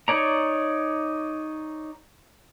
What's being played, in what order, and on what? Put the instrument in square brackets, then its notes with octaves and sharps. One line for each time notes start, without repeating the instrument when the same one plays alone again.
[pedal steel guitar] D#4 C#5 D5 A#5